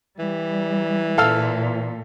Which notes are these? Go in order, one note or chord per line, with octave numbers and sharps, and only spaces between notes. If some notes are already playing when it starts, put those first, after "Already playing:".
E3 G3
A#2 A4 F5 E6